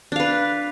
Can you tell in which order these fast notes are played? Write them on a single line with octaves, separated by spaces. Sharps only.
D4 F5 B4